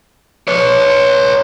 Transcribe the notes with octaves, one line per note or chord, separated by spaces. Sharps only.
B4 C#5